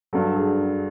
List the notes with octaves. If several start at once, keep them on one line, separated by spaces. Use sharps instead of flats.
G2 D3 F#3 A4
G#4